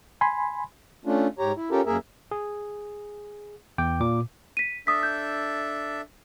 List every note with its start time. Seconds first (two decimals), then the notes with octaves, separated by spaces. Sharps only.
0.21 G#5 B5 C6
1.05 A3 C#4 D4 F4
1.39 G#2 G4 C#5 A#5
1.56 E4
1.71 C#4 F4 G4 A4 A#4
1.86 F#2 A#3 G#4 A#4 E5
2.31 G#4
3.78 E2 G5 D6
4.00 A#2 D6
4.57 B6 D#7
4.87 D4 A4 E5 D#6 B6
5.03 G6